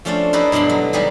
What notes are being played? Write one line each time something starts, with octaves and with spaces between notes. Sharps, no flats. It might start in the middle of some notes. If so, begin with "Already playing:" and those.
F3 A3 C#4 D4 C5 D5
D#4 E4 G4 B4 C5 D5
G2 B2 D3 B5 C6
F#3
D#3 G3 G4 G#4